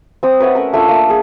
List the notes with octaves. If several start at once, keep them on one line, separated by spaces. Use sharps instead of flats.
C4 D#6
B4 C#5 E5 F#5
A3 C#4 A#4
A3 D4 F4
A#3 E5
G#4 A#4